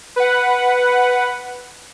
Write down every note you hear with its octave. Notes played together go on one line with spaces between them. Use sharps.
B4 F#5